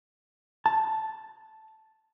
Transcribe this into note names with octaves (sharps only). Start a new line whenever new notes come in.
A5